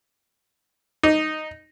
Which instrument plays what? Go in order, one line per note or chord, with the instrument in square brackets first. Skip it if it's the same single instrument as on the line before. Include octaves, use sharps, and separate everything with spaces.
[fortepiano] D#4